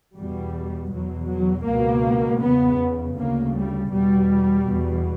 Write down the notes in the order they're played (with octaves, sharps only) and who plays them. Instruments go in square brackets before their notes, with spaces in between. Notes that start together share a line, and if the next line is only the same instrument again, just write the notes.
[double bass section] E2 B2 G3
E2 B2 F#3
F#3
C#2 B2 A#3
E2 C#3 B3
D2 C#3 A#3
G3
E2 B2 G3
E2 B2